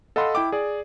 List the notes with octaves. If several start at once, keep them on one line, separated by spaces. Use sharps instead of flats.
A4 D#5 F5 F#5 B5 C6
E4 G5 D6
G#4 D5